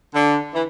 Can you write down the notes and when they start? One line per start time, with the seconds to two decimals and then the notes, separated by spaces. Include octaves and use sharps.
0.15 D3
0.54 E3